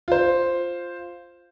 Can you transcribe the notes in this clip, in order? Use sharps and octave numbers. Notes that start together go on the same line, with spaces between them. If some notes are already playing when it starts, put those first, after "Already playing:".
F4 C5